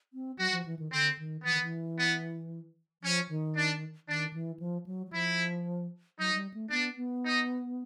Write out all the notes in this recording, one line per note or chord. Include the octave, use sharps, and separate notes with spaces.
C4
F#3 F#4
F3
E3
D#3
D3 C4
D#3
E3 B3
D#3
E3
B3
F3 C#4
D#3
D4
D#3 D4
E3
F3
F#3
F#3
F3 E4
F#3 D#4
G3
A3
B3 D4
B3
D#4